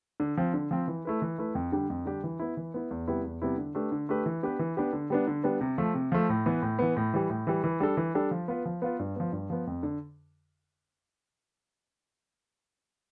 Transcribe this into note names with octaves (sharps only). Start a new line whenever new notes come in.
D3
F3 C4
D3
F3 C4
E3
A3 E4 B4
E3
A3 E4 B4
F2
D3 G3 D4 G4
F2
D3 G3 D4 G4
E3
B3 E4
E3
B3 E4
E2
C3 G3 B3 E4
E2
C3 G3 B3 E4
D3
A3 D4 G4 B4
D3
A3 D4 G4 B4
E3
B3 D4 G4 B4
E3
B3 D4 G4 B4
D3
G3 B3 D4
D3
G3 B3 D4
C3
F3 A3
C3
F3 A3
A2
E3 B3
A2
E3 B3
A2
E3 G3
A2
E3 G3
E3
G3 D4 A4
E3
G3 D4 A4
F3
B3 F4 B4
F3
B3 F4 B4
G2
F3 B3
G2
F3 B3
F2
D3